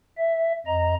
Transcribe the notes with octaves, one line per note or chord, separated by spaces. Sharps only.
E5
F2 D#5 A#5